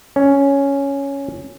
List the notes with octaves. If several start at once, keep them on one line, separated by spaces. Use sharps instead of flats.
C#4